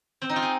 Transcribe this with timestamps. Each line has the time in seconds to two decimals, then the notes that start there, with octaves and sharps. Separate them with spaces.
0.22 C4
0.29 D#4
0.36 F4
0.42 G#4